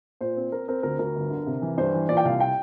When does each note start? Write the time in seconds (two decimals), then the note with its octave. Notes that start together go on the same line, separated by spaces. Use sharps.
0.21 A#2 C5
0.37 C4
0.52 C4 A#4
0.68 C4 A#4
0.83 D2 A#4
0.99 D2 A#4
1.16 G1
1.31 D3
1.46 C3
1.62 E3
1.77 G2 C5
1.94 E3
2.09 A#2 D5
2.17 G5
2.25 C2 F5
2.40 G5